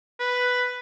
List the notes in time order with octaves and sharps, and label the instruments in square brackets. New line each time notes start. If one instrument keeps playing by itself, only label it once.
[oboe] B4